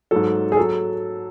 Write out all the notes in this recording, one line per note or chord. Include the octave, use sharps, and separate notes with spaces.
G#2 F#3 A4
G#4
F#3 A4